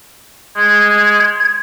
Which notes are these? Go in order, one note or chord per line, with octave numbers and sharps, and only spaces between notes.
G#3 G#6